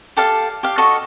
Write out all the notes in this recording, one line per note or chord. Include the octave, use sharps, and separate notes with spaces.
G4 A4 D5 F5
G4 F5
F#4 A4 D#5 C#6